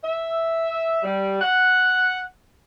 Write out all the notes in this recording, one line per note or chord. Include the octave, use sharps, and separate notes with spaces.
E5
G3
F#5